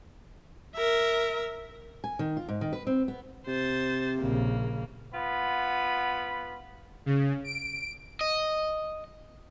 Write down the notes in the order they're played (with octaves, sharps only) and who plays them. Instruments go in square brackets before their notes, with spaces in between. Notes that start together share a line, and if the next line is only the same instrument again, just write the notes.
[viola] A#4 E5
[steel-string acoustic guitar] G#5
D#3
F4
G#2
D#3
B4
C4
B3
[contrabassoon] C3 [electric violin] C5 A6
[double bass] A#1 C#3 [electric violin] A#3
[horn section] B3 F4 B5
[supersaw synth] C#3
D7
[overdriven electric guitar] D#5